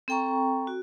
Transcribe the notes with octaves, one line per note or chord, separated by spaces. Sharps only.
C4 A4 G5 A#5 C#6
F#4